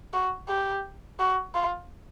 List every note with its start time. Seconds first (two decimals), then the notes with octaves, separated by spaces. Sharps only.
0.13 F#4
0.49 G4
1.19 F#4
1.55 F4